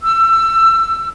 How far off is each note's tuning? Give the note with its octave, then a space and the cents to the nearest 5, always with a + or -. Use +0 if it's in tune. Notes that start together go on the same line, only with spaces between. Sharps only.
E6 +25